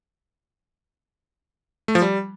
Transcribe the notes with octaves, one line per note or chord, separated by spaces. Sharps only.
A3
F3
G3